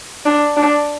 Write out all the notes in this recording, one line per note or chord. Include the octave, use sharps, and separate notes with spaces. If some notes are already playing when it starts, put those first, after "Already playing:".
D4
D4